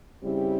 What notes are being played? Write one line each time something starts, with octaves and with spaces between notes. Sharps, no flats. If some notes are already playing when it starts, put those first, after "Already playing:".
C#3 G3 C4 E4 G4